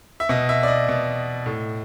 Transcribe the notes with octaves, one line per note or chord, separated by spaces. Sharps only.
E5
B2 D#5
E5
D5
D#5
B2
A2